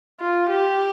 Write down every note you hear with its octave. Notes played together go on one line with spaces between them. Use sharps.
F4
G4